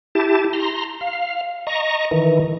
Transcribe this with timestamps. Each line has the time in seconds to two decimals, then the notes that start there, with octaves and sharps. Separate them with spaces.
0.15 E4 G4 A5
0.53 A#5 C6
1.01 F5
1.67 D#5 A#5 C#6
2.11 D#3 E3